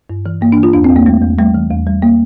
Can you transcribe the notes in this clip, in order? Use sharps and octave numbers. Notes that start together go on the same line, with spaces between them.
G2
E3
G2 A#3
D4
E3
F4
E2 D4
C4
E2
A#3
G3 A3
E2
G3 A3
E3
E2
G3
A#3